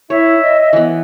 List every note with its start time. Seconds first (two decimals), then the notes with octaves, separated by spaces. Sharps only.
0.10 E4 C#5 E5
0.42 D#5
0.73 E3 B3